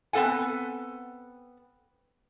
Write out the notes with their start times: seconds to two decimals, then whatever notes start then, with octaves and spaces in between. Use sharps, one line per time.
0.13 B3 C4 A4 F#5 G#5